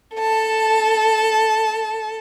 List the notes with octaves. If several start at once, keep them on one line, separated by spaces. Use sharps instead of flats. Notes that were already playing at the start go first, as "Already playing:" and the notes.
A4 A5